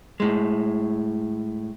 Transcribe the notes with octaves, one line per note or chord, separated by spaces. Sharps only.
A2 G#3